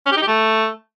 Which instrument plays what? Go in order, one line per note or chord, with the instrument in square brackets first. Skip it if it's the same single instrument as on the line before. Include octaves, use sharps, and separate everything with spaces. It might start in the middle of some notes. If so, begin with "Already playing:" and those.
[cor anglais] C#4
G4
D#4
G4
A3